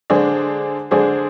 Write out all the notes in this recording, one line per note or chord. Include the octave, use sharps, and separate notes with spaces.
D3 G#3 D4 G#4 C5
D3 G#3 D4 G#4 C5